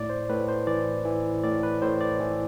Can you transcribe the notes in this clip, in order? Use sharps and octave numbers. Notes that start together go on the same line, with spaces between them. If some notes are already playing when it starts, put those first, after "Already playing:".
Already playing: A2 D5
C5
A2 B4
C5
E3 D5
E3
A2 D5
B4
A2 C5
D5
E3